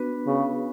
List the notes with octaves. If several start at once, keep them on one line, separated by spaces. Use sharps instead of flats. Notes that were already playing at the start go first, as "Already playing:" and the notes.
Already playing: B3 D4 F#4 B4
C#3